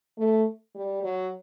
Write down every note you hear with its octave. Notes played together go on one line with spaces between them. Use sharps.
A3
G3
F#3